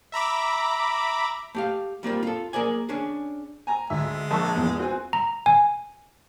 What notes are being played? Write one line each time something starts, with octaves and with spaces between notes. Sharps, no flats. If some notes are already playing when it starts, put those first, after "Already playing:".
E5 A#5 B5 D6
A3 G4 F5
G3 A#3 C4 F4
F4 A4
A#3 G#4 A#4 D5 G#5
C#4 D4 G#4
G#5 A#5
D2 G#3 E5
A#1 E5 A5 C#6
E2 F3
C4 F#4 G#5
A#5
G#5